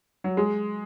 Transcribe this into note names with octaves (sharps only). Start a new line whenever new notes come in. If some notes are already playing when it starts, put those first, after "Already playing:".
F#3
G#3